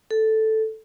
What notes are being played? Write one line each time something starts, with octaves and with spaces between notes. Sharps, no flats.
A4